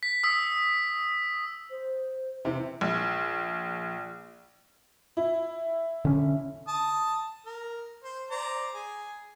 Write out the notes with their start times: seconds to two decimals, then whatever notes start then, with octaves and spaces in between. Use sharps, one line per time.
0.03 B6
0.23 D#6 E6 B6
1.71 C5
2.45 C3 E3
2.81 A#1
5.17 E4
6.05 D3 C#4
6.68 A5 D#6
7.45 A#4
8.04 C5
8.31 C5 D5 A#5
8.74 G#4